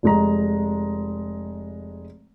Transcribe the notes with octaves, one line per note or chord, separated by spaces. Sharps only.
F1 G#3 A#5